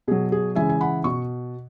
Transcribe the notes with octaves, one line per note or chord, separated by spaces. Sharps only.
B2 F#3 G#4
G#4
C#3 E3 G#3 E5 G#5
G#5
F#5 B5
B2 C#6